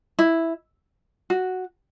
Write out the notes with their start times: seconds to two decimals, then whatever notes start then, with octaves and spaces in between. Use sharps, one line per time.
0.19 E4
1.30 F#4